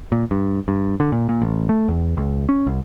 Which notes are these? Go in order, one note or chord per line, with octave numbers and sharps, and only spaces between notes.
A#2
G2
G2
D3
A#2
A#2
A1
A3
E2
C#2
C#4
C2